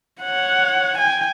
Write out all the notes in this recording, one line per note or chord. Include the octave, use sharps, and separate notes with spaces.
C#5 F#5
G5 G#5